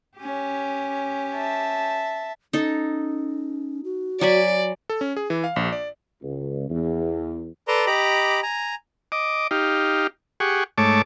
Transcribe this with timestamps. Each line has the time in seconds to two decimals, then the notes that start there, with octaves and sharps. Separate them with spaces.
0.18 C#4 G4
1.34 E5 A5
2.53 C#4 D#4 A4
3.84 F#4
4.21 F#3 D5 G#5 B5
4.90 A4
5.01 C#4
5.17 G#4
5.30 E3
5.44 F5
5.56 A#1
5.72 D5
6.23 C#2
6.70 E2
7.68 A4 B4 D5 A5 A#5 C6
7.87 G4 D#5 A#5 B5 D6
8.43 G#5 A#5
9.12 D#5 D6
9.51 D#4 G4 F5
10.40 G4 G#4 F#5 C#6
10.78 G#2 A3 C#5 A5 D6